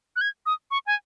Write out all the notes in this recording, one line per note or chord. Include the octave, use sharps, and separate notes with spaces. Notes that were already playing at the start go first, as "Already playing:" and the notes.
F#6
G#6
D#6
C#6
G#5